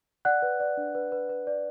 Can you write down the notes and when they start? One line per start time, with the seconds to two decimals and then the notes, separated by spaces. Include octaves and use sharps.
0.25 D5 F#5 F#6
0.42 B4
0.60 D5
0.77 D4
0.95 B4
1.12 B4
1.29 B4
1.47 D5